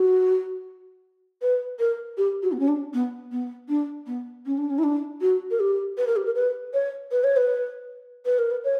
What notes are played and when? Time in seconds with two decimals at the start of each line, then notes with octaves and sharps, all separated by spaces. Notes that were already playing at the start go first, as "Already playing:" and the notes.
Already playing: F#4
1.42 B4
1.79 A#4
2.18 G4
2.43 F#4
2.52 B3
2.60 C#4
2.68 D4
2.94 B3
3.32 B3
3.69 D4
4.07 B3
4.46 C#4
4.58 D4
4.70 C#4
4.78 E4
4.83 D4
5.21 F#4
5.51 A#4
5.60 G4
5.97 B4
6.07 A#4
6.16 G4
6.26 A#4
6.36 B4
6.74 C#5
7.12 B4
7.24 C#5
7.37 B4
8.26 B4
8.39 A#4
8.51 B4
8.64 C#5